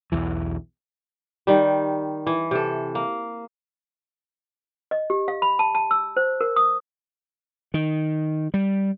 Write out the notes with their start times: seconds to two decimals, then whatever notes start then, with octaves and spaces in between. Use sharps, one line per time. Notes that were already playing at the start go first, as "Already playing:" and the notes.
0.12 B1 E2 E3
1.47 D#3 G3
2.27 E3
2.51 C3 A4
2.95 A#3
4.91 D#5
5.10 G4
5.28 F5
5.42 B5
5.59 A5
5.75 A5
5.91 E6
6.17 C5
6.41 A#4
6.56 D#6
7.74 D#3
8.54 G3